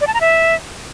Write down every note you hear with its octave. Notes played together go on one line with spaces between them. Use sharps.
D5
A5
A#5
E5